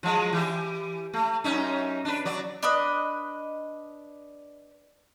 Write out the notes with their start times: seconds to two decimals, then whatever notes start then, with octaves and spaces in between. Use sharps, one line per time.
0.03 F3 F#3 G#3
0.33 E3 G4
1.14 A3
1.44 F#2 C#4 D#4
2.05 D4 B4
2.25 F#3 D5
2.63 D4 B4 D#5